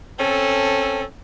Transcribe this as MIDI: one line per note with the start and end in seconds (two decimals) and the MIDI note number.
0.19 1.03 60
0.19 1.03 61
0.19 1.03 69